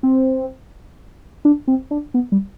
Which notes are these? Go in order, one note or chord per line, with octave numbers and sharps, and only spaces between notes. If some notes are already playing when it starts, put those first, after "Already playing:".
C4
D4
C4
D4
B3
G3